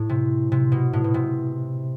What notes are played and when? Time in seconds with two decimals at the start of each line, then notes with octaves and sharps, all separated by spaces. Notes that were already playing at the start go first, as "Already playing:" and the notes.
Already playing: A2
0.09 C3
0.52 C3
0.72 B2
0.93 A2
1.04 B2
1.14 C3